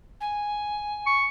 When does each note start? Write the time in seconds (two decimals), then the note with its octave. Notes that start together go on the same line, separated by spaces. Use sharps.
0.20 G#5
1.07 C#6